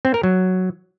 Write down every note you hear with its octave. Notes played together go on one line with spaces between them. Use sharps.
C4
A#4
F#3